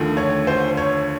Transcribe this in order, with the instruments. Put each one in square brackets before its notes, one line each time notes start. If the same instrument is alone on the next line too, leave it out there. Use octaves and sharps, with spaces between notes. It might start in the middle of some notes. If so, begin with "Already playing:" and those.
Already playing: [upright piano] D#2 D3 F3 A3
C#5
C5
C#5